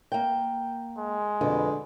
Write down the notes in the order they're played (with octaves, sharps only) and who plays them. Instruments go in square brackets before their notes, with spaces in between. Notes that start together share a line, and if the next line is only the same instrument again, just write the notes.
[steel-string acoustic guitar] A#3 G5
[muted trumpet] G#3
[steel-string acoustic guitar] F2 B2 [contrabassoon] D3